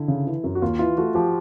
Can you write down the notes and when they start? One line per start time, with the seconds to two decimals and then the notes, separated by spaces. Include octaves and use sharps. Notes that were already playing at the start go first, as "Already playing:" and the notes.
Already playing: D3 E4
0.08 C#3
0.27 E3
0.44 F#2
0.55 F#4
0.62 D#2 F4
0.79 E3 F4
0.97 A3 F#4
1.15 F3 G4